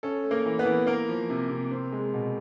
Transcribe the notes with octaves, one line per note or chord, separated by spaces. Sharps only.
C#4 A4
A3
A#3 A#4
E3
B3 B4
E3
A#3 A#4
F3
C3
C3
C4
G#3
B2